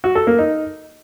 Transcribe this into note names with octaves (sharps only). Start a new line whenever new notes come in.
F#4
A4
A#3
D#4